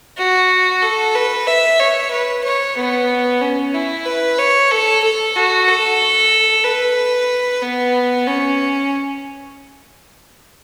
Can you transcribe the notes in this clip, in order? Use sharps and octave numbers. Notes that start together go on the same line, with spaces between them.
F#4
A4
B4
E5
C#5
B4
C#5
B3
C#4
E4
B4
C#5
A4
A4
F#4
A4
B4
B3
C#4